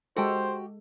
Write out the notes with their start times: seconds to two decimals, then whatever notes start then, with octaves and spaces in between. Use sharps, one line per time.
0.17 G#3 F#4 G4 A4 C5 G5